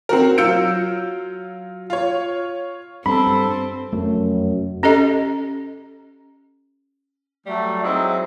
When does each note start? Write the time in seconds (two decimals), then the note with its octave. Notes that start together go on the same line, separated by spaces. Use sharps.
0.09 C4 F#4 A#4
0.38 F#3 F4 E6 G6 C#7 D7
1.90 F4 C#5
3.06 G2 C4 A4 B5
3.93 F1 F#2 A3
4.83 C#4 G4 A4 D#5
7.47 F#3 G3 A3
7.82 F#3 G#3 C4 D#4 E4